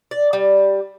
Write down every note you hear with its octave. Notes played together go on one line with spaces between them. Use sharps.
D5
G3